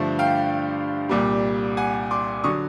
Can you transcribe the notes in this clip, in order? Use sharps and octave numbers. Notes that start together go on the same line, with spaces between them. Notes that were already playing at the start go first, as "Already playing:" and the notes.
Already playing: G2 D3 F3 A3
F5 G5
C2 A#2 G3
F#5 G#5
C6 D6
D3 F#3 C#6 D#6